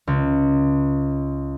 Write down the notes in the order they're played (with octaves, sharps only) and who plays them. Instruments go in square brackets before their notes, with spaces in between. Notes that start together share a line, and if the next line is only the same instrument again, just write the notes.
[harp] C#2